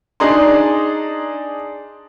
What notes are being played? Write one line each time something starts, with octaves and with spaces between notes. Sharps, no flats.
D4 D#4 G#4 D5 A#5 C6